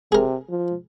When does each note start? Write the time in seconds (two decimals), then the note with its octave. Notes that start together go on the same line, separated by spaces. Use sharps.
0.12 C3 G#4 A#4
0.49 F3